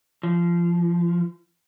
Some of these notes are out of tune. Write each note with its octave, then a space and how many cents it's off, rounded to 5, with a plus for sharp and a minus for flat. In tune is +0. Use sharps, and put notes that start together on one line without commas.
F3 -20